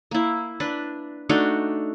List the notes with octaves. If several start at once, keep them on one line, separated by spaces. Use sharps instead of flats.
A#3 E4
D4 B4
A3 D4 D#4 F#4